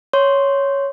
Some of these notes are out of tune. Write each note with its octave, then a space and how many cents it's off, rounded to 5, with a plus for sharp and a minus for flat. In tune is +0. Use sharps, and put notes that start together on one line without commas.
C#5 +0 C6 +0